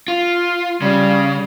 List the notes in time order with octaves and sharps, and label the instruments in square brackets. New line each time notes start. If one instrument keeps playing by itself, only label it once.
[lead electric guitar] F4
[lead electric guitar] C#3 [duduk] G3